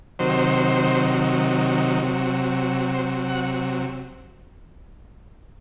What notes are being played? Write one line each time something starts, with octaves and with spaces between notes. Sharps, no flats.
C3 D#3 F#3 C5
C3 F#3
C5
F#5